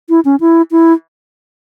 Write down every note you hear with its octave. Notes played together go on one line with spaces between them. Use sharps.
E4
C#4
E4
E4